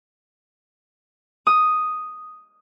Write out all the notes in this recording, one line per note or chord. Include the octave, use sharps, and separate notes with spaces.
D#6